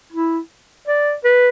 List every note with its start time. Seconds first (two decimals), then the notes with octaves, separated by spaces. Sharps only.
0.13 E4
0.88 D5
1.25 B4